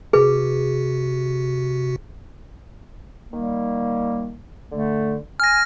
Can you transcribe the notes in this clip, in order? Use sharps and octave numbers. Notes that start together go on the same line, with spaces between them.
C3 F#4 G#4 B4
D#3 G3 A#3
D3 A3
G#5 F6 A#6